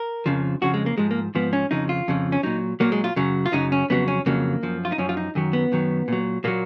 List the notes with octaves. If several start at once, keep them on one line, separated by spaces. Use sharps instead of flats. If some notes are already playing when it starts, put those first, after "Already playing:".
Already playing: A#4
F2 C#3 F3
F2 C#3 F3 F#4
G#3
A#3
G#2 F3 G#3
A#3
G#2 F3 B3
C#4
F2 C#3 F3 D#4
F4
F2 C#3 F3
C#4
A#2 F#3 D#4
A#2 F#3 A#3
G#3
F4
F#2 C#3 F#3
F4
F#2 C#3 F#3 D#4
C#4
F2 C#3 F#3 B3
C#4
F2 C#3 F#3 A#3
F#2 F3
F4
D#4
F#2 F3 C#4
F4
D#4
F#2 D#3 F#3
B3
F#2 D#3 F#3
A#2 F#3
A#2 F#3 A#3